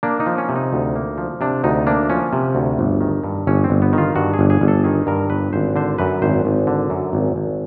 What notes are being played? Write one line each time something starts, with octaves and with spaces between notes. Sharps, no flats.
A#3 D4
D#4
F3
C#4
C3
D#4
D2
A#3
F3
C3 D4
D2 D#4
A#3 D4
F3 C#4
C3
D2
G1
D#3
G2
G1 C#4
C4
G1
B3
D#3 F4
G2 F#4
G#4
G1
G#4
G1
A4
D#3 G#4
G2 A#4
G1 B4
G#1 C5
D3 C5
F#2 B4
G#1 C5
G#1
D3
F#2
G#1
G#1